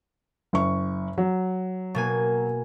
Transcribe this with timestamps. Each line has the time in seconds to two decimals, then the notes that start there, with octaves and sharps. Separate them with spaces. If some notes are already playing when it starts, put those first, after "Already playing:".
0.53 F#1 C#6
1.18 F#3
1.95 B2 A#3 G#5